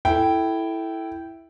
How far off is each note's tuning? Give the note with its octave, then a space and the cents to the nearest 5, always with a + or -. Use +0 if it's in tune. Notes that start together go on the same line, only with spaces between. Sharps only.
E4 +0 A4 -5 G5 -10